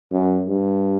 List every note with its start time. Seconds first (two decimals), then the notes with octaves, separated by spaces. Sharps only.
0.12 F#2
0.47 G2